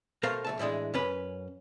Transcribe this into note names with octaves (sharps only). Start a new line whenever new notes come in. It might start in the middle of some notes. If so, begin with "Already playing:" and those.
B2 A3 A#4 C5 F5
B1 A3 A5
A2 E3 G#3 D4
F#2 C#4 B4